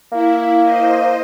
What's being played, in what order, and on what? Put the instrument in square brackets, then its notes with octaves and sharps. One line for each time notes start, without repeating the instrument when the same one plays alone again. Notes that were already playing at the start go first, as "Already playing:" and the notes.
[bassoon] A#3 [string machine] E4
[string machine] C5 D#5